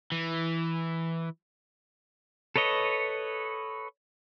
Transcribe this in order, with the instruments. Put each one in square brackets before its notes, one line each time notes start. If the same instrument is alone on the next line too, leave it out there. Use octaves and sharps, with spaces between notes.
[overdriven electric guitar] E3
[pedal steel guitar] A4 B4 C#5 D#5